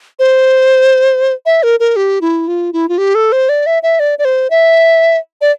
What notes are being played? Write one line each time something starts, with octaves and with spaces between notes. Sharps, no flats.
C5
E5
A#4
A#4
G4
E4
F4
E4
F4
G4
A4
C5
D5
E5
E5
D5
D5
C5
E5
D5